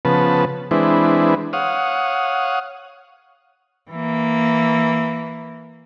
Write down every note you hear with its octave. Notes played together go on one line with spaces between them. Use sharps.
C#3 F3 B3 B4 A5
E3 G#3 C4 D4 E4 B4
C#5 F5 F#5 D#6
E3 A#3